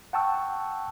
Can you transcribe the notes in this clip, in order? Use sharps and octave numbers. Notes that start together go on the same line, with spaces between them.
F#5 G5 A5 C#6 E6